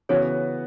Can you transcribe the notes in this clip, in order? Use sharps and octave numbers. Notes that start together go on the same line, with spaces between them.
C#3 E3 B3 F#4 A4 B4 C#5